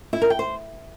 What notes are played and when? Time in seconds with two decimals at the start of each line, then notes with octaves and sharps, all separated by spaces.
0.13 E4
0.22 A#4
0.30 G5
0.39 C5